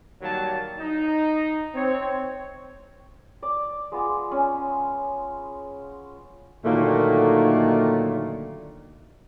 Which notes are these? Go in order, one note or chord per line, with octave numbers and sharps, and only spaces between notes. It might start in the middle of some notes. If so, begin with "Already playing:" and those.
D#3 F#3 G3 A#3 F5 A5
D#4
C4 C#5
D5
G#3 B3 F4
C#4
A#2 D3 D#3 F#3 A3 A#3